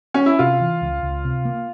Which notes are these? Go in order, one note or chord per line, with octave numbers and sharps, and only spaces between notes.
C#4
E4
C3 F4
E3
C#2
C#2
C3
A#3